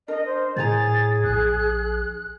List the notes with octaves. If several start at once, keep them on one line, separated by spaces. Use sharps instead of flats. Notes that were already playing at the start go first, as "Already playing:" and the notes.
D4 A#4 D#5
C5
A2 G#4 C#5 G#5 A#5 A6
A#1 F#6